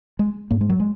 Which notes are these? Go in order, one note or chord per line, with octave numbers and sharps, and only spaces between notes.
G#3
G#2 A#3
G#3
F#3
G#3